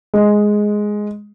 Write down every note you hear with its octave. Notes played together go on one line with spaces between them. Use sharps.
G#3